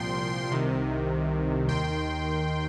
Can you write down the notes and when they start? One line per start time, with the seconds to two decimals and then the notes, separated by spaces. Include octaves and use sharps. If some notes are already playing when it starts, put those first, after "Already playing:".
Already playing: C2 A#2 F3 G5 C6
0.51 C2 C3 D#3
1.68 D#2 D#3 G5 C6